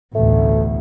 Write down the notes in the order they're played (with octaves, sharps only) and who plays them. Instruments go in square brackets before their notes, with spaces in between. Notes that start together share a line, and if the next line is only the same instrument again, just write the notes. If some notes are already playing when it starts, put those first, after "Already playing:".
[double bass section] A1 D2 B2 [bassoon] A3